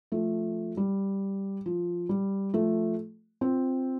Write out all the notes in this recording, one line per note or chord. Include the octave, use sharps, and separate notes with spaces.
F3 A3
G3
F3
G3
F3 A3
C4 F4